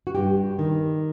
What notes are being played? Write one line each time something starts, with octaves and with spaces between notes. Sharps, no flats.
F#4
G2 G4
D#3